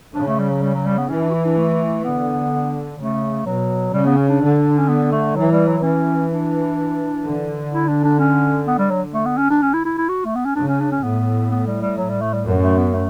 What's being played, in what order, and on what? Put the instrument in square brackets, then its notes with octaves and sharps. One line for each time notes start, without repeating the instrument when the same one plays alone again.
[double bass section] C#3 [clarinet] D4
[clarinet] A3
G3
F#3
G3
F#3
G3
B3
[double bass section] E3 [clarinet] C#4
[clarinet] D4
F#4
E4
D4
A3
[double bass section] D3 [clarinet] B3
[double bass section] C#3 [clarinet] A3
[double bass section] B2 [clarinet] F#3
[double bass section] C#3 [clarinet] G3
[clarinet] B3
C#4
D4
[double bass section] D3
[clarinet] C#4
B3
A3
[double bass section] E3 [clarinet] F#3
[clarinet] G3
F#3
[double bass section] E3 [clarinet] C#4
[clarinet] D4
[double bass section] D3
[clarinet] E4
D4
D4
C#4
B3
G3
F#3
A3
B3
C#4
D4
C#4
E4
E4
E4
F#4
A3
B3
C#4
[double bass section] C#3 [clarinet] D4
[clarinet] C#4
D4
C#4
[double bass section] A2 [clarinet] B3
[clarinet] B3
G3
G3
F#3
G3
A3
G3
[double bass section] F#2
[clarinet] A3
B3
A3